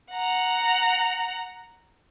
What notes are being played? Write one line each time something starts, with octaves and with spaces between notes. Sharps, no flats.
F#5 A#5